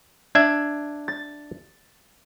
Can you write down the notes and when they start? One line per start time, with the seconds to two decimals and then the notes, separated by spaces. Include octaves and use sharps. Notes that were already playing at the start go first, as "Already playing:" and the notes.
0.35 D4 E5 G#6
1.08 A6